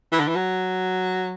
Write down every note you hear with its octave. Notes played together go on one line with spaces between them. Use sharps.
E3
D3
E3
F#3